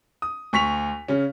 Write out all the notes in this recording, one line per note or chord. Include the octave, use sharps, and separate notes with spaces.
D#6
D2 C#6 B6 F7
C#3 C#4